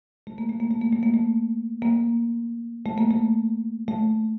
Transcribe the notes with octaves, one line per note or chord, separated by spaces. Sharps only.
A3
A#3
A3
A#3
A3
A#3
A3
A#3
A3
A#3
A3
A#3
A3
A3